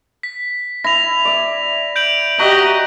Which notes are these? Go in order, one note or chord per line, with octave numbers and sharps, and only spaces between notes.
B6
E4 A#6 F7
D5 E5
G6 D7 F#7
F#4 G4 D#5 E5 A#5